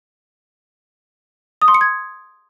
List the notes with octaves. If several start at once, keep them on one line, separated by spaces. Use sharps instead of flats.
D#6
C6
C#7
G#6